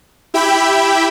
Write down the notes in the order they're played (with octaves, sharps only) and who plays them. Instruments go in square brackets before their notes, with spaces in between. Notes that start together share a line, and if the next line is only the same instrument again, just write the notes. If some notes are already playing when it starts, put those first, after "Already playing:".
[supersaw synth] E4 G4 E5 G5 B5